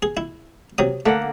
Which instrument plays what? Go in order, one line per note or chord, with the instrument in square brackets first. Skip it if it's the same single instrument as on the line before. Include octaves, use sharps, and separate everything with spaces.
[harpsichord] G#4
E4
C3 F#3 D#6
[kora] D3 A#3 F#5 [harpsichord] A3